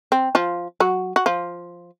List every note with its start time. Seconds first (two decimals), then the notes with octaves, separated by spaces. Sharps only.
0.12 C4
0.35 F3 F4
0.80 F#3 F#4
1.16 F#4
1.26 F3 F4